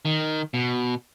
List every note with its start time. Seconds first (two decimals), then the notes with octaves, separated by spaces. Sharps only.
0.05 D#3
0.54 B2